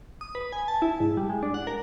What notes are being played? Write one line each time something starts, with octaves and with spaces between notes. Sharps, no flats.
D#6
B4
G#5
A5
E4
G#2
G3
G#3
D4
F#5
A#4